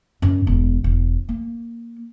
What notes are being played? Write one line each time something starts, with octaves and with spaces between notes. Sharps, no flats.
F#2
E1
E1
A#3